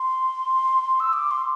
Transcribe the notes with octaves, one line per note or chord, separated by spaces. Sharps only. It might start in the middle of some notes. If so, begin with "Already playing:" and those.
Already playing: C6
E6
D6
C6